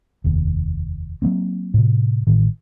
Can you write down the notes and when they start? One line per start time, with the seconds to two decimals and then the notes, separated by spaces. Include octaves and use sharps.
0.24 F1 D#2
1.22 F#3 G3 A#3 C4
1.74 A2 C3
2.27 A1 A2 D#3